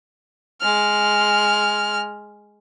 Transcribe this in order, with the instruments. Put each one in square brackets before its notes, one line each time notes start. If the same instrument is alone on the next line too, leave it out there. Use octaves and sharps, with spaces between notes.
[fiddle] G#3 F6